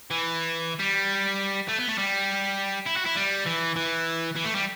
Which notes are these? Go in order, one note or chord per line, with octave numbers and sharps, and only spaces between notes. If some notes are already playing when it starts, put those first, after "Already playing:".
E3
G3
A3
B3
A3
G3
E4
F#4
E4
G3
E3
E3
E3
A3
G3